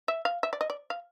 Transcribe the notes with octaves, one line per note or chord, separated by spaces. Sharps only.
E5
F5
E5
D5
D#5
D5
F5